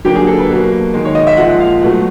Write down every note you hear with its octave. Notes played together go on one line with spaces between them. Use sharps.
D3 F#3 A#3 G4
G#4
A4
B4
B2 F#3 A#3
D#3 G#3
C#5
D#5
E5
A#2 F3 G#3 F#5
F5
B2 F#3 A3 F#5